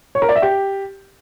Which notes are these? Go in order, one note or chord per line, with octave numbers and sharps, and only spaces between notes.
C#5
A#4
D5
E5
G4